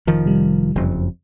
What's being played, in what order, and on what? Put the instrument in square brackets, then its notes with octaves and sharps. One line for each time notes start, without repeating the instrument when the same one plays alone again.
[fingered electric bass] F1 D#3 F3
[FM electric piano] C3 G3
[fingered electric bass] F#1 F2